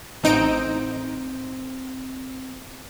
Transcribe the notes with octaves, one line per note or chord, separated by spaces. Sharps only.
A1 C4 D#4 D7